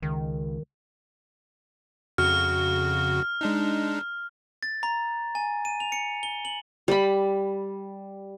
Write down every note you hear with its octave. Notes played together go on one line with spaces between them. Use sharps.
C#2 D#3
F2 C#3 F#4 F6
G#3 D4 D#4
A6
A#5
G#5
D#7
F7
C#7
G7
F#7
G3 B5